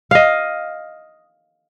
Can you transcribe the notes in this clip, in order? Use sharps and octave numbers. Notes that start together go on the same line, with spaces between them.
D#5 F5